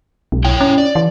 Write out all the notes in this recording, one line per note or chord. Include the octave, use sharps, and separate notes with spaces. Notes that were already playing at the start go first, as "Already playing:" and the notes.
B1
E4 C#5 G5
C#4
D5
E3